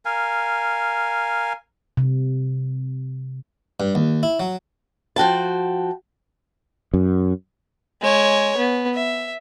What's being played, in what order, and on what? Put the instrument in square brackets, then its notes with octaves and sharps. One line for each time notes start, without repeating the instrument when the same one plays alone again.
[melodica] A#4 F5 G#5
[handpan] C3
[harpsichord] G2
D#2
E4
F#3
[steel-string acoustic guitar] F3 F#4 G5 A5
[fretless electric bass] F#2
[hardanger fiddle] G#3 C#5
B3
E5